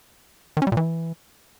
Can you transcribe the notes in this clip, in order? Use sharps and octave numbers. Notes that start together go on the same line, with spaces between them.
D#3
C#4
G3
A#2
E3